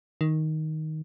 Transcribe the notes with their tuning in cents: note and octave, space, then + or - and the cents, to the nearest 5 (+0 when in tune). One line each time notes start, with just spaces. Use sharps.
D#3 +5